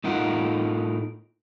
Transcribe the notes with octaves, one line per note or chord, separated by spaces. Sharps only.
A2 D#4 F4 A#4 F#5